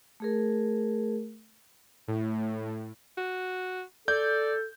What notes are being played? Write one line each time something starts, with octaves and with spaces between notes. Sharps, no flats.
A3 G#4 A#4
A2
F#4
A4 D5 G6